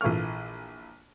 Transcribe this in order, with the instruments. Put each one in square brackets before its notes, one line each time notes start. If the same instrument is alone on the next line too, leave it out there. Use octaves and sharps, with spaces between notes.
[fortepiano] A#1 E3 F4 A4 C#6 F6